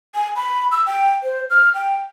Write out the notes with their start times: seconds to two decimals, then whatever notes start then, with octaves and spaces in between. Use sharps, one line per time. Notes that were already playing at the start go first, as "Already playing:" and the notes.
0.15 G#5
0.36 B5
0.71 E6
0.86 G5
1.23 C5
1.50 F6
1.74 G5